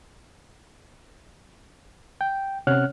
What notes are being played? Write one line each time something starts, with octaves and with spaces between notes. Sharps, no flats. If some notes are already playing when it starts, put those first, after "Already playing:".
G5
C3 C#4 C#5 F#5 F6 F#6